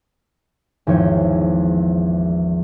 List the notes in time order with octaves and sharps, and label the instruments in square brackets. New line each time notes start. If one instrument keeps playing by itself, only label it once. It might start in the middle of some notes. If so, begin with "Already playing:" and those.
[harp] G#1 E2 F3 C#5 G6